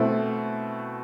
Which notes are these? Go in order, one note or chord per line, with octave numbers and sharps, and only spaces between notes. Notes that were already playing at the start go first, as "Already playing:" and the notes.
Already playing: B2 A3 C4 E4